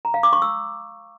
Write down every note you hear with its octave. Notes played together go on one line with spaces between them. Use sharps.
A#5
F5
D6
C#6
E6